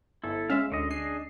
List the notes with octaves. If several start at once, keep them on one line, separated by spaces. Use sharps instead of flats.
G1 E4 A4
G#3 C#4 E5 F5
D2 D3 D#5
D4 G#4 D#5 C7